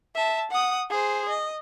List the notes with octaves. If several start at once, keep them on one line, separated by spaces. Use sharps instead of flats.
E5 A5
F#5 D#6
G#4 C5
D#5